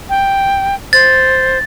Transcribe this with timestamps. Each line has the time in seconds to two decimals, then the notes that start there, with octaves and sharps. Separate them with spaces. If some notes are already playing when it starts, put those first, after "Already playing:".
0.10 G5
0.93 C5 A6